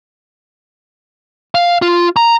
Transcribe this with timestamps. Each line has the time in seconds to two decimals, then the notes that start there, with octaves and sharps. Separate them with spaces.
1.55 F5
1.82 F4
2.16 A#5